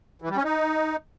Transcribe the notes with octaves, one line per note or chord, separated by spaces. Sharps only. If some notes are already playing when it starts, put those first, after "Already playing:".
E3
G3
C#4
D#4